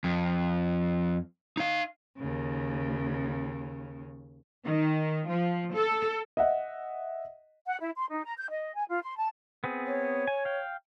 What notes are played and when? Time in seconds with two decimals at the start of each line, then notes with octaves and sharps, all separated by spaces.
0.04 F2
1.57 D#4 F5
2.18 D#2 C#3
4.65 D#3
5.28 F3
5.75 A4
6.37 D#5 E5 F#5
7.66 F#5
7.80 E4
7.95 C6
8.11 D#4
8.25 A#5
8.38 G6
8.50 D#5
8.75 G#5
8.88 F4
9.03 C6
9.17 A5
9.64 B3 C4 G#4
9.87 C#5
10.27 G#5
10.45 F5 G5